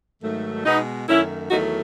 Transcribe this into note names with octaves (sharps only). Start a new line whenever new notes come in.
G#2 D#3 F#3 A3
B2 G#3 B3 D#4
F#2 D#3 A3 C#4 E4
E2 D#3 F#3 A3 D#4 F#4